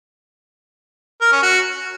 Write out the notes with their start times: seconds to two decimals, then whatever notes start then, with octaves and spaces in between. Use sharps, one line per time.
1.21 A#4
1.32 C#4
1.43 F#4